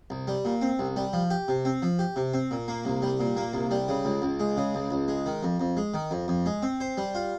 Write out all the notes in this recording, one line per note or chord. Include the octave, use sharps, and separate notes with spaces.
C2
G3
A#2
C4
C2
G3
F3
G4
C3
C4
F3
G4
C3
C4
A#2
A#3
C2
G3
A#2
A#3
C2
G3
C#3
C#2
C#2
G#3
C#3
C#2
C#2
G#3
D#3
F2
F2
G#3
D#3
F2
F2
G#3
C4
C5
G3
F4